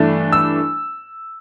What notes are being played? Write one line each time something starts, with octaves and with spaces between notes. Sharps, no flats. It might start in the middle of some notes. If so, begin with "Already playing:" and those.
Already playing: G2 E3 A3 D4
E6